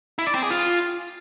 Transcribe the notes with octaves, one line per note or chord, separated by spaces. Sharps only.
E4
D5
C4
G#4
F4